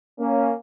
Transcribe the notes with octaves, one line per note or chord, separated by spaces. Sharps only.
A#3 C#4